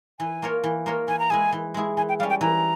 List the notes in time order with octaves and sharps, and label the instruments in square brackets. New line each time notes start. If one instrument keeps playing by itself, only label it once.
[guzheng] E3 [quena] G#5
[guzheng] A#3 F4 A#4 C#5
E3
A#3 F4 A#4 C#5
[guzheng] E3 [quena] G#5
[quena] A#5
[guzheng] G#3 E4 G#4 [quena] G#5
[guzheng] E3
G#3 E4 G#4
[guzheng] E3 [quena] G#5
[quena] G5
[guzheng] G3 C#4 [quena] F5
[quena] G5
[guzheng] E3 [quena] A#5